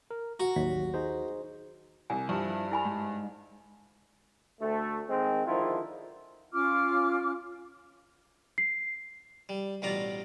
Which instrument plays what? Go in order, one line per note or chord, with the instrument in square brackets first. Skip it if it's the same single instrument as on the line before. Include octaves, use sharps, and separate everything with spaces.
[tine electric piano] A#4
[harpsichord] F#4 [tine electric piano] A#5
[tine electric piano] A1 F#3 B6 [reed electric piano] D#2
[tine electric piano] D#4 G#4 C5
[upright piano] C2 [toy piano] G#5
[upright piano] G2 [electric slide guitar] F3 E4
[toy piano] E4 G#5 B5
[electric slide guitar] G#2
[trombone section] D2 A3
D#3 G#3 C4
D3 D#3 F3 G#3 E4 F4
[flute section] C#4 F4 D6 F6
[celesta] C7
[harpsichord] G3
A1 B2 G3 F4 D5 A#5